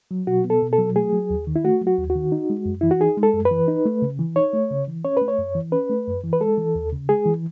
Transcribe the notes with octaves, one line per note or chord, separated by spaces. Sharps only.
F#3
B2 F#4
B3
A4
B2
A4
F#3
A3 G#4
F#3
D#2
D#3
E4
A3 F#4
F#3
F#4
D#2
F#4
D#3
D#4
G#3
F#2
E3 E4
F#4
D#4 G#4
G#3
A4
F#2
B4
E3
D#4
A3
C#3
E3
D#4 C#5
A3
C#3
E3
C#4 C#5
A3 B4
C#5
F#2
E3
C#4 B4
A3
F#2
E3
B4
G#3 A4
E3
D#2
C#3
G#3 G#4
E3